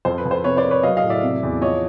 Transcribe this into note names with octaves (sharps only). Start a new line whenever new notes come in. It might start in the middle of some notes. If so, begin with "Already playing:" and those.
F2 C5
B4
F2
C5
C3 B4 C#5
C5 D5
A#3
B4 C#5
F#3 D#5 F5
D#5 F5
A2
D5 E5
C3
E2
F3 C#5 D#5